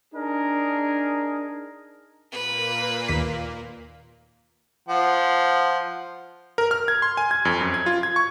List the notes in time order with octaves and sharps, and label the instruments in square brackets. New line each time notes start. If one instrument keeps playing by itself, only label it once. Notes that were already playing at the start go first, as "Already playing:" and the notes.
[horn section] D4 D#4 G#4 A#4
[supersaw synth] A#2 A#3 [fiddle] B4
[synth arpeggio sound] D#2 D#3 B6
[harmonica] F3 F#5
[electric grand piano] A#4
F6
G#6
C6
G#5
G#6
F2
F#2
G#6
F4
G#6
C#6